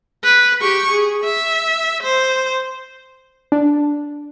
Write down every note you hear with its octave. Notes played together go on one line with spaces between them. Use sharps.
B4
G4 C#6
G#4
E5
C5
D4